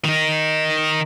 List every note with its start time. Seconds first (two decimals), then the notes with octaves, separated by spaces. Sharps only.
0.05 D#3 D#4